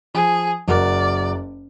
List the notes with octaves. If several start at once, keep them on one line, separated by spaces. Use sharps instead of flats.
F3 G#4
F#1 F#4 A#4 D5